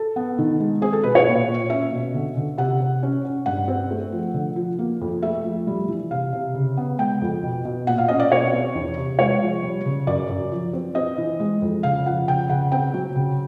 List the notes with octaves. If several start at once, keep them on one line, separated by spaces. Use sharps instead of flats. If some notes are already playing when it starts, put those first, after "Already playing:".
Already playing: A4
B3
D#3
G#3
C4 G#4
A4
B2 B4
C#5
A#2
A#2
C#4 E5
B2
D3
D3
C3 F#5
C3
C#4
C#4
G2 F#5
C4
A3
F3
D3
F3
A#3
F2
A3 E5
F3
G3
E3
C3 F5
C3
C#3
B3
G#3 G5
F2
B2
B2
A#2 F#5
F5
C#4 D#5
D5
B2 C#5
C4
E2
C3
G#3 C#5
F3
G3
C#3
F#2 D5
F#2
F3
C4
C4 D#5
E3
G#3
F2
C#3 F5
F3 F#5
C#3 G5
C#3 F#5
C4 G5
F#3
C#3